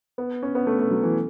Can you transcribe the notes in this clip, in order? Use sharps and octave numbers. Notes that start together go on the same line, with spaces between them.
B3
C#4
B3
A3
A3
F#3
E3